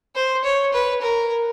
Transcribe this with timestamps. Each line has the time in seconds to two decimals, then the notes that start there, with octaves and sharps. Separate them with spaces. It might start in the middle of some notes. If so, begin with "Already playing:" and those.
0.15 C5
0.44 C#5
0.73 B4
1.02 A#4